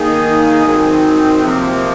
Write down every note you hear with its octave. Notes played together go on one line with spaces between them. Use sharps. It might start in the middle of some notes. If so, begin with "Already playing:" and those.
Already playing: D#3 A#3 D#4 G#4
G#2 D#3 F#3 C4 D#4
C3 F3 A#3